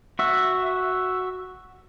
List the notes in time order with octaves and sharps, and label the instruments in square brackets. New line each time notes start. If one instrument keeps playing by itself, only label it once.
[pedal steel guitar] F#4 E5